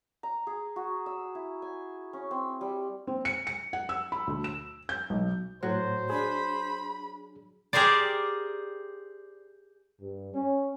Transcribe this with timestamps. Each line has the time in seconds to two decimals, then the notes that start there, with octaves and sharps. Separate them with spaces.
0.23 A#5
0.47 G#4
0.76 F#4
1.06 E6
1.35 E4
1.62 G#5
2.13 C#4
2.31 C4
2.61 G3
3.07 C4
3.25 C#7
3.47 C#7
3.73 F#5
3.89 E6
4.12 B5
4.27 D2
4.44 E7
4.89 G6
5.10 B1
5.63 A2 F#3 C5
6.10 D4 G#4 B5
7.73 G4 G#4 A#4 C5 D5
10.01 G2
10.34 C#4